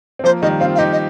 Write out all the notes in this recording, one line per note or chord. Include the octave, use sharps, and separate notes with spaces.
C4
F3 A#3 C5
D#3 G3 D#5
C4 F4 F5
F5
D#4 G4 D#5
D#5